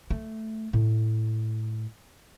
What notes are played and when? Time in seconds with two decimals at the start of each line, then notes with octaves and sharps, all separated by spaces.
0.11 A3
0.73 A2